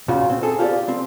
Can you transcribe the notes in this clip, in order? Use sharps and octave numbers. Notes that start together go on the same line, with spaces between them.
A#2 C#3 C#4 F4 F#4
C4
G#4 A4
F4 G4 C5 D5
C4